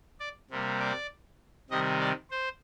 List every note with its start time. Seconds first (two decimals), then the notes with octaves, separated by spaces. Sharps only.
0.20 D5
0.51 C3 G3 A#3
0.80 D5
1.70 C3 D#3 G3 D#5
2.00 D5
2.31 C5